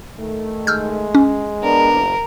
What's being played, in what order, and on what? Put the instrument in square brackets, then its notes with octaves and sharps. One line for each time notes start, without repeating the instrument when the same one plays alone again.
[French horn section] D#3 A3
[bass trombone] G#3 [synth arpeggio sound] E6 F6 G6
[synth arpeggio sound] C#4
[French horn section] B3 D4 [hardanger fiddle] A#4
[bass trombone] F#1